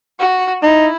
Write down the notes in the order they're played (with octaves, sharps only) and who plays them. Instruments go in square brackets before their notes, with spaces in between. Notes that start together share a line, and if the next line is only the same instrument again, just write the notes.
[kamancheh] F#4
[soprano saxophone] D#4 [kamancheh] E4